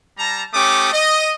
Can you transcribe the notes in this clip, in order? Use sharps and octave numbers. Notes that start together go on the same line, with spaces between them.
G3 A5 A#5
A3 C#4 G4 D6 D#6
D#5